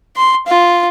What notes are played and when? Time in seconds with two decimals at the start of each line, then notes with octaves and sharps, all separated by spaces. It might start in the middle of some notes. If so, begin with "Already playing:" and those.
0.17 C6
0.47 F4